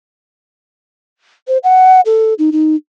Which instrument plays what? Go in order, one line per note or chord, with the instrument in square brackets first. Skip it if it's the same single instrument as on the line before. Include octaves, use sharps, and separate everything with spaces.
[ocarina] C5
F#5
A4
D#4
D#4